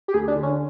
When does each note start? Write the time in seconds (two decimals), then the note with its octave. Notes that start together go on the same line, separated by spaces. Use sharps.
0.08 G4
0.14 D2 G#4
0.28 D4
0.36 D3
0.43 C#4